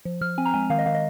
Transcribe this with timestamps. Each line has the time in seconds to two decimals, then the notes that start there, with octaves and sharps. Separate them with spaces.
0.05 F3
0.21 F3 F6
0.38 C4 G#5
0.46 A#5
0.54 G#3 G#5
0.70 D#3 F5
0.79 D#5
0.86 D#3 F5
0.95 D#5